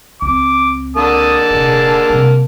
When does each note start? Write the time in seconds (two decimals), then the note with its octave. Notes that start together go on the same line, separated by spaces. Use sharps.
0.22 C#2 C4 D6
0.97 D3 A#3 A5 D#6
1.50 D#1 C3 G#4
2.10 C3 G3